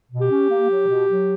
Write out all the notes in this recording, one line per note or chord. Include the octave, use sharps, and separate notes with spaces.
B2
G4
C#4
A#3
F#3
B2
F#3